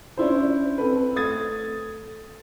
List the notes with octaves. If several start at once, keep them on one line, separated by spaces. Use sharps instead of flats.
C#4 D4 E4 C5
C4 A4 B4
A3 D#6 G#6 A6